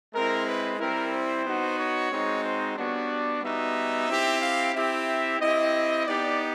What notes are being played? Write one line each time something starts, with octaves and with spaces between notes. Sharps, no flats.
G#3 C4 E4 A#4
B4
G3 C4 E4 A#4
C5
B3 D#4 F#4
C#5
G#3 C4 D#4 F#4
C5
G3 B3 D4 F#4 C#5
D5
G3 B3 D#4 F#4 E5
C4 E4 G4
F5
C4 E4 G4 E5
C4 E4 G4 D#5
B3 D#4 G4 D5